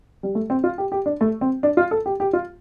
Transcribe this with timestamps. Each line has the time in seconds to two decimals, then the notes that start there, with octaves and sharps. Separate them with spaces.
0.23 G3
0.35 A3
0.50 C4
0.64 F4
0.78 G4
0.92 G4
1.06 D4
1.21 A3
1.41 C4
1.63 D4
1.77 F4
1.91 A4
2.06 G4
2.20 G4
2.33 F4